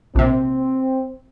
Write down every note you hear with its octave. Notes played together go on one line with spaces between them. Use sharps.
A#1 C3 C4